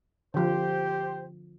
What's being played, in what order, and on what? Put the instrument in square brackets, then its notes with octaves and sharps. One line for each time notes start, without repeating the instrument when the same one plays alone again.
[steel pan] D3 F3 [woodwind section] G4 C5